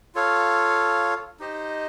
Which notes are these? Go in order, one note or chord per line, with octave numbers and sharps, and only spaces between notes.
F4 A4 C#5 F5
D#4 G4 C5 D#5